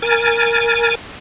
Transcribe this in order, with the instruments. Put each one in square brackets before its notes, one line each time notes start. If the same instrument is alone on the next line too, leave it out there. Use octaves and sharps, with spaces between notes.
[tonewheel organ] A#4 G#5 A6